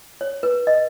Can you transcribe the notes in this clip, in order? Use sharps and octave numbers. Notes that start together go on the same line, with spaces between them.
C#5
B4
D#5